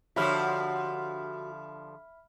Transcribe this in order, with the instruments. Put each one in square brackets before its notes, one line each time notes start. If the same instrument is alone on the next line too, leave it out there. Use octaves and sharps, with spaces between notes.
[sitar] D3 F3 G4 [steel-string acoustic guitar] F#4 C#5 [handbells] E5 B5 F6